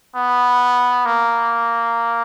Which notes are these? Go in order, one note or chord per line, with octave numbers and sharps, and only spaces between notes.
B3
A#3